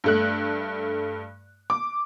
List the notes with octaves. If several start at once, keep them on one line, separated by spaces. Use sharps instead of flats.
G2 A3 F#6
D6